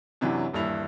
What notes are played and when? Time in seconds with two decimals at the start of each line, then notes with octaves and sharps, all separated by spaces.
0.21 F#2 C3 E3 F#3 D4
0.53 D#1 G2 E3 E4 F7